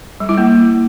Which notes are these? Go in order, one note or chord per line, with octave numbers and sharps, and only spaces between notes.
G3
E4
A#3